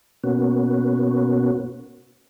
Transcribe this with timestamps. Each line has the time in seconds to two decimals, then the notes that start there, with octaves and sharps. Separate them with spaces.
0.24 B2 A#3 B3 C#4 F#4